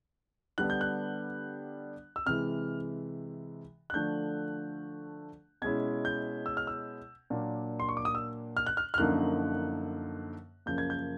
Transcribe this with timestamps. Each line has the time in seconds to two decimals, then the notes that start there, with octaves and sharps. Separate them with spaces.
0.58 D3 G3 B3 D4 F#6
0.70 G6
0.81 F#6
2.16 E6
2.26 C3 E3 G#3 F6
3.90 F#6
3.94 D3 F3 A3 D4 G6
5.62 B2 G#3 C#4 E4 G#6
6.05 G6
6.46 E6
6.57 F6
6.67 E6
7.30 A#2 F#3 A#3 D4
7.80 C6
7.89 C#6
7.97 D6
8.05 D#6
8.15 E6
8.57 F6
8.67 F#6
8.77 F6
8.94 F6
8.98 F#2 D3 F3 A#3 D#4 F#6
10.66 F#2 C#3 F3 A#3 G6
10.78 G#6
10.90 G6